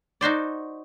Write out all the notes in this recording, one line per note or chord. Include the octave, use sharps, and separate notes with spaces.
D#4 F#4 C5 D5